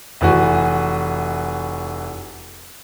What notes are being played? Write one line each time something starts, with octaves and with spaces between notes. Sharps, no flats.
F1 E3 F#4